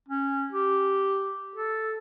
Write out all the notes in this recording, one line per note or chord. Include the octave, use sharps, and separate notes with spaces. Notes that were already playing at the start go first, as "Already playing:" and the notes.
C#4
G4
A4